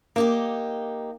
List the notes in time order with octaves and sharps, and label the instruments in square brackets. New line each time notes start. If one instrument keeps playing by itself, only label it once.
[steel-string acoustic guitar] A#3 D#4 G4